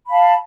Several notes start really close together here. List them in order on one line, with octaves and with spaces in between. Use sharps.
B5 F5 A5